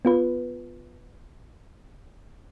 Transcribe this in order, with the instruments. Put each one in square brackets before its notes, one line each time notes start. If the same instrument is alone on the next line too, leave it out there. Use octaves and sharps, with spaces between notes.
[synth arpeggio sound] B3 F4 B4